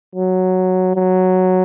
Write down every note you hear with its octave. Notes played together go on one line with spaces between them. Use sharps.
F#3
F#3